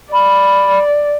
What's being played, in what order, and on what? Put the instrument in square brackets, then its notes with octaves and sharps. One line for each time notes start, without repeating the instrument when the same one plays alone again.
[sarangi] D5 [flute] B5